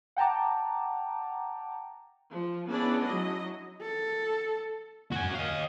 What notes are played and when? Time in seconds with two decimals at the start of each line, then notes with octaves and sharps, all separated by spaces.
0.17 F#5 G5 A5 A#5 D6
2.33 F3
2.68 B3 C#4 D4 E4 G#4 D5
3.04 F#3 E4 D#5
3.82 A4
5.12 F#4 G#5
5.35 D#5 F5